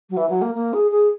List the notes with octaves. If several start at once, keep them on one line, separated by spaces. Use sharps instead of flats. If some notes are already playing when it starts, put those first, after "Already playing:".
F#3
E3
F#3
A#3
A#3
G#4
G#4